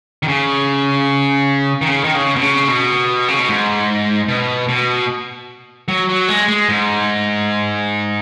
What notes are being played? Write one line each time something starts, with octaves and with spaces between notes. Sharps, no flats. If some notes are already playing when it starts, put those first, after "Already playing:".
D#3
C#3
D#3
C#3
D#3
C#3
B2
C#3
B2
C#3
B2
G#2
B2
B2
F#3
F#3
G#3
G#3
G#2